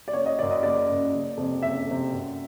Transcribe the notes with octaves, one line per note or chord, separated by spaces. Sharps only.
D5
F#1 C#5
D#5
F#2 C#3 D5
D#5
F#1 D5
F#2 C#3
F#1
F2 C3
F#1 E5
F2 C3
F#2